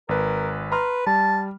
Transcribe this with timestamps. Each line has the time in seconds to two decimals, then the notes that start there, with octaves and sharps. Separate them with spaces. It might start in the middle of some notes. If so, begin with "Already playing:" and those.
0.09 G#1 A#4 B4
0.72 B4 A#5 C6 F6
1.07 G3 A5